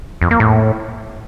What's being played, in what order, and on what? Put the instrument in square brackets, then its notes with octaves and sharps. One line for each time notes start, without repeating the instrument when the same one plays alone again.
[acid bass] F2
A#3
A2